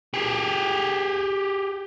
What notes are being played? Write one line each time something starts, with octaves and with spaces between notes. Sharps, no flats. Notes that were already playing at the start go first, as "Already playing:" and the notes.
G4 G#4